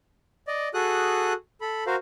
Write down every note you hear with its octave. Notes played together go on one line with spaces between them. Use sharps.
D5 D#5
F#4 G#4 A4 D#6 F#6
A4 B5
F#4 A#4 C5 F5